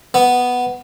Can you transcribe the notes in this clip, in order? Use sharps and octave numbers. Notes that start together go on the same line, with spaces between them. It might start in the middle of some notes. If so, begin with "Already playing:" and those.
B3